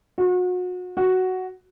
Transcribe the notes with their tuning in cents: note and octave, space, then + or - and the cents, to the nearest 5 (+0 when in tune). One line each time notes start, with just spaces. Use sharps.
F#4 -35
F#4 +5